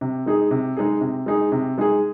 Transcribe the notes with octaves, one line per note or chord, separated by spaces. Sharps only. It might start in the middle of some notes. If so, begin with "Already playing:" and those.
C3
G#3 D#4 G#4
C3
G#3 D#4 G#4
C3
G#3 D#4 G#4
C3
G#3 D#4 G#4